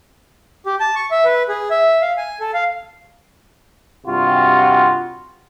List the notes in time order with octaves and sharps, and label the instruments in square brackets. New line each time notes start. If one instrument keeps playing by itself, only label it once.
[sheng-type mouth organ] G4
A5
C#6
E5
B4
G#4
E5
F5
G#5
A4
F5
[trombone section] G2 C3 F4 F#4